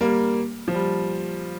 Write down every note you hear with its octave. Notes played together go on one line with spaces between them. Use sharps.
G3 A#3
F3
G3